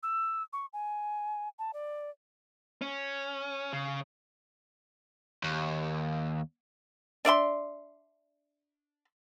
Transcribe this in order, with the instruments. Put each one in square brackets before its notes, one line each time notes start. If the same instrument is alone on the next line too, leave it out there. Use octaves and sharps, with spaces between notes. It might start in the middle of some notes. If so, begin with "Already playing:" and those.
[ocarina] E6
C#6
G#5
A5
D5
[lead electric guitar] C#4
C#3
[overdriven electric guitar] D#2
[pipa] D4 D5 E5 C6